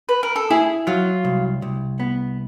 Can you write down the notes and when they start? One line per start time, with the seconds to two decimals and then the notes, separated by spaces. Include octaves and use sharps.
0.09 B4
0.23 A#4
0.36 A4
0.50 E4 G#4
0.87 F#3 F4
1.25 C2
1.62 C2
2.00 B3